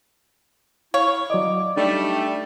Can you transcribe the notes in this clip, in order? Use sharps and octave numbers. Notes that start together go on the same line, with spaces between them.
E4 C#5 F5
F#3 D5 D#5 D6
G3 A3 D4 D#4 D5